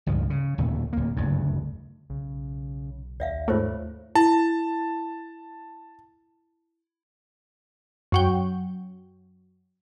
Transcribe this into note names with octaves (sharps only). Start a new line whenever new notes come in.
G1 C#2 G2 F3
C#3
D1 D#2 A#2 A3
D1 A#3
F#1 D2 G2
B1 C#3
D#2 D5 E5 F5
G#2 A3 F4 C5 C#5
E4 A5
F#2 F#3 G5